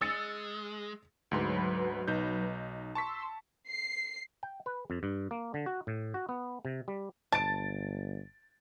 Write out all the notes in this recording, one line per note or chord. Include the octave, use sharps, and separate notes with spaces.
G#3 E6 A6 C#7
D2 G#2 F#3 B4 C6
B1 D#4 G6
A5 C6 C#6 E6 B6
C7
G5
B4
F2
G2
A#3
D3
F#4
A2
F#4
B3
C3
G3
G1 A5 A6 D7